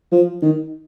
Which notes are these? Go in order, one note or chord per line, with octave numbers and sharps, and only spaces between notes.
F3
D#3